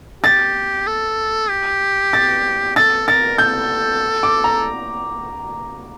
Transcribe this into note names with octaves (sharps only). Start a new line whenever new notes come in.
G4 A6
A4
G4
A6
A4 A6
A#4 A6
A4 G6
D6
A#5